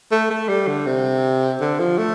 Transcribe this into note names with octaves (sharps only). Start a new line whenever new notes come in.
A3
A3
G3
D3
C3
D3
F3
A3